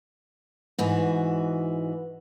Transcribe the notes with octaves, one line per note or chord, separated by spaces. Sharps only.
G#2 E3 F#4